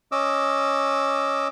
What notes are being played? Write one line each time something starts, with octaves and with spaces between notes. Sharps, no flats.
C#4 D#5 D6 E6